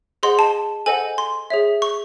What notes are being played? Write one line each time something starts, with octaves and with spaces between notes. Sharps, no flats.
G#4 C5 D#5 F#5 C6
A5
A4 C5 D#5 F#5 G#5
C6
G#4 C#5 E5
C#6